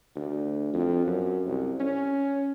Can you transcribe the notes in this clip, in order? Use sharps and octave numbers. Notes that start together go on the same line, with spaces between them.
D2
F2
F#2
C2
C#4